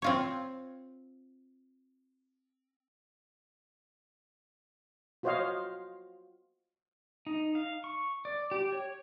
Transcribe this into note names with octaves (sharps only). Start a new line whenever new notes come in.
C4 F4 C#5
F4 F#4 C5 C#5 D#5 F5
D#4
F5
C#6
D5
G4
C#5